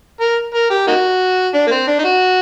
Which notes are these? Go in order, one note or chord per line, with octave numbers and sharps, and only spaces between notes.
A#4
A#4
G4
A#3 D#4 F#4
D4
A#3
C4
D4
D#4
F#4